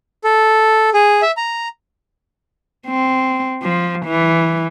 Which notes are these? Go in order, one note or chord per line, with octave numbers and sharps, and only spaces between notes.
A4
G#4
E5
A#5
C4
F3
E3